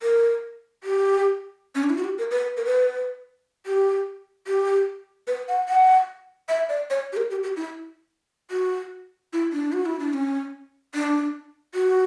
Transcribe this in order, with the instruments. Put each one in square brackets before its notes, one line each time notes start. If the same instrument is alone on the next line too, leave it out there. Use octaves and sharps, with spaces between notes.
[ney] A#4
G4
C#4
D4
E4
F#4
G4
A#4
B4
A#4
B4
G4
G4
B4
F#5
F#5
E5
D5
C#5
G4
A#4
G4
G4
E4
F#4
E4
D4
F#4
E4
D4
C#4
D4
F#4